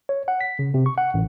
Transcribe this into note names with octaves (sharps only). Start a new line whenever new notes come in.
C#5
F#5
B6
C#3
C3
C#6
F#5
A1